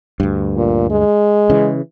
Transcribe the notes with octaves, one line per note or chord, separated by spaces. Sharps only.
D2 G2
A#2
G#3
C#3 E3